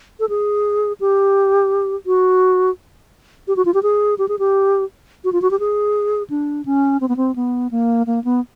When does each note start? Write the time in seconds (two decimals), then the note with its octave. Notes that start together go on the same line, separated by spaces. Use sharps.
0.20 A4
0.29 G#4
1.00 G4
2.06 F#4
3.48 G4
3.56 F#4
3.65 F4
3.74 G4
3.83 G#4
4.18 G4
4.28 G#4
4.39 G4
5.24 F#4
5.32 F4
5.42 F#4
5.51 G4
5.60 G#4
6.30 D4
6.66 C#4
7.01 C4
7.09 B3
7.17 C4
7.36 B3
7.71 A#3
8.07 A#3
8.24 B3